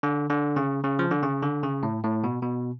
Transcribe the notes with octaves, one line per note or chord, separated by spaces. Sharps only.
D3
D3
C#3
C#3
F3
D3
C#3
D3
C#3
A2
A2
B2
B2